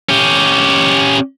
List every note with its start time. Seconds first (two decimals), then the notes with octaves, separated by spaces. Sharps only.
0.09 C#4 G4